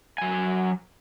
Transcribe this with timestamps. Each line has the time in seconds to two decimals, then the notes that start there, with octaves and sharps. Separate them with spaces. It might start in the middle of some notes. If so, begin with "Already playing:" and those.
0.18 F#3 G#5